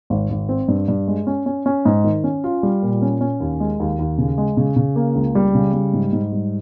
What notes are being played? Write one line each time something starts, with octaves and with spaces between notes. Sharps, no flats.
G#1
G#1
C4
G2
G2
G#3
C#4
C#4
C#4
G#2
D#3
C#4
F4
G3
A#2
C#4
C#4
D#2
G#3
D#2
D#2
C#3
G#3
C#3
C#3
A#3
C#2
G3
C#3
G3
G#2
G#2
G3